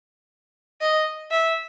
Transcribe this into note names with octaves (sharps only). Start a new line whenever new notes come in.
D#5
E5